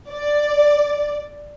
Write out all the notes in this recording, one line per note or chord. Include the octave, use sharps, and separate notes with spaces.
D5